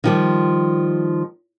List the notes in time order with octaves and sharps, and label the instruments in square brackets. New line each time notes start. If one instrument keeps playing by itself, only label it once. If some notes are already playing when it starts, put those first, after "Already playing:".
[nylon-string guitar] D#3 F3 G3